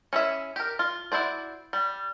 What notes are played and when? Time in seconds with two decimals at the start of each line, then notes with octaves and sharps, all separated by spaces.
0.13 C#4 E4 G#4 E5
0.56 G4 A#4
0.79 F4
1.12 E4 F#4 C5 D5
1.73 G3